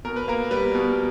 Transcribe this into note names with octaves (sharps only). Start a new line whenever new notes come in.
B2 A#4
B4
A#3 A#4
G3 B4
B2